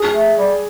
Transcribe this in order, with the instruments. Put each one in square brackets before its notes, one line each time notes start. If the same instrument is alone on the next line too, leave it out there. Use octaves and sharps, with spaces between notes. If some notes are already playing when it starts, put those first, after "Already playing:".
Already playing: [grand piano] G#4
[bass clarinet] A3
G3